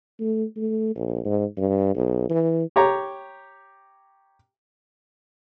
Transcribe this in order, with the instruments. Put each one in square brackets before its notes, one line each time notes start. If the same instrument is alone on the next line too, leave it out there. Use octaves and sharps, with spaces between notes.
[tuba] A3
A3
A#1
G#2
G2
B1
E3
[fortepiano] G4 C#5 A#5